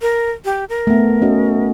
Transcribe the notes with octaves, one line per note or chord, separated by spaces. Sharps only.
A#4
G4
A#4
A3 B3
C#4 F#4 D#5